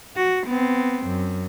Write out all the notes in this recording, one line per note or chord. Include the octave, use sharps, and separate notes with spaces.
F#4
B3 C4
F#2